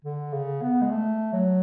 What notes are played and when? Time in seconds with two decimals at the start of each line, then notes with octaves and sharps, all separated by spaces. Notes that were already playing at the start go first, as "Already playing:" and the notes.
0.05 D3
0.33 C#3
0.62 B3
0.81 G#3
0.91 A3
1.33 F#3